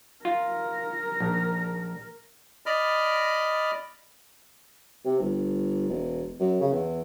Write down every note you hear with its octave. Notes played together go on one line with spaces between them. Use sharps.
F4 A#4
A#1
D5 D#5 B5 F6
C3
G1
E1
F#2
C#3
E2